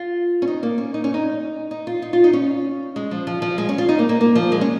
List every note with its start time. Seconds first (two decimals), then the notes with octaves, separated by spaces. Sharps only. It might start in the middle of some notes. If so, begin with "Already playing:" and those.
Already playing: F4
0.42 C#4
0.48 D#4
0.63 A#3
0.78 C#4
0.94 D#4
1.04 C#4
1.14 D#4
1.71 D#4
1.87 F4
2.02 D#4
2.13 F4
2.24 D#4
2.33 C#4
2.96 G#3
3.11 F3
3.27 F3
3.42 F3
3.58 G#3
3.69 C#4
3.78 F4
3.89 D#4
3.99 A#3
4.09 A#3
4.21 A#3
4.35 F3
4.52 G#3
4.61 C#4